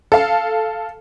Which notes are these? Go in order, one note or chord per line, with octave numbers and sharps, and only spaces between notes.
A4 F5